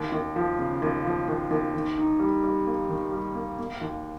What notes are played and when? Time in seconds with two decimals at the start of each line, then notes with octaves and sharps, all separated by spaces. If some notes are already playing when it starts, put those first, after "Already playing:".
Already playing: D#2
0.12 D#2
0.36 F3
0.59 C#3
0.82 D#2
1.05 F3
1.28 D#2
1.51 D#2
1.74 D#3
1.98 D#4
2.19 G3
2.43 G3
2.67 A#3
2.89 D#3
3.12 G3
3.35 A#3
3.59 A#3
3.81 D#2